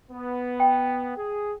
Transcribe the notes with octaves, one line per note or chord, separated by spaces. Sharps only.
B3
G5
G#4